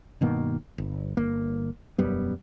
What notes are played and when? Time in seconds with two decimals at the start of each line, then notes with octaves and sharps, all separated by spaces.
0.21 G2 B2 D#3 A#3
0.78 G1
1.17 G1 A#3
1.98 E1 F#2 G3 B3